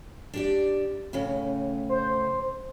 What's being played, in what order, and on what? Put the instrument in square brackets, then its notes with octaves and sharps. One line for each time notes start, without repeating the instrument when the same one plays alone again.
[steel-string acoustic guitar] D4 G4 D5
A2 C#3 C#4
[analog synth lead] C5